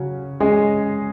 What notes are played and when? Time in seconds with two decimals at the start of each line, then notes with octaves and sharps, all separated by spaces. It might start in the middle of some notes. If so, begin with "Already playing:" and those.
Already playing: C#3 F#3 C#4 F#4
0.40 G#3 C#4 G#4 D#5